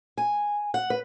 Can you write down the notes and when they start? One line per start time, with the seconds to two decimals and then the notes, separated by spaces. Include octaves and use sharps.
0.17 G#5
0.74 F#5
0.90 B4